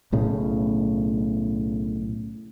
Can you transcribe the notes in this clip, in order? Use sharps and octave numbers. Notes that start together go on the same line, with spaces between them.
B1 A2 C#3